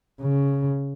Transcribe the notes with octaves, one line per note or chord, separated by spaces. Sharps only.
C#3